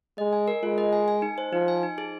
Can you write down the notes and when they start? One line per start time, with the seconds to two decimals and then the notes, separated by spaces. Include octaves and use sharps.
0.18 G#3 D#5
0.33 G#5
0.48 A#4
0.63 G#3 F4
0.78 D#5
0.93 G#5
1.08 G#5
1.22 D#4
1.38 C5
1.52 F3 D#4
1.68 G#5
1.83 D#4
1.98 G#4